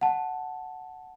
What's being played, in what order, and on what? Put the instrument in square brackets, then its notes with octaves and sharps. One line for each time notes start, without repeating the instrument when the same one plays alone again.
[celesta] F#5 A5